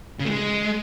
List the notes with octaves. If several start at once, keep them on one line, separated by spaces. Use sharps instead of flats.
C#3
A3
G#3